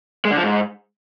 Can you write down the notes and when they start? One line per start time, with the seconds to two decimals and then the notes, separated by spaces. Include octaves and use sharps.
0.25 G#3
0.31 D3
0.37 F3
0.43 G#2